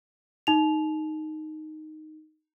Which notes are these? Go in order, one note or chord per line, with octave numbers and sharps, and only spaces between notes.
D#4 F7